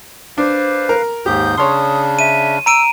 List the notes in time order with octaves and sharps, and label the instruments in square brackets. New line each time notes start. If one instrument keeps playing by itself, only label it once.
[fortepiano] D4 [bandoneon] B4 F5 [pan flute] C5
[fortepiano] A#4
[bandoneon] D#2 G#2 G6 [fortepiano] G4 [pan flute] D#6
[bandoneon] C#3 D4 [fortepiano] C#5 C6
[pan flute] E5 [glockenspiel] D#7
[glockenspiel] A#5 D7 D#7 [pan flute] E6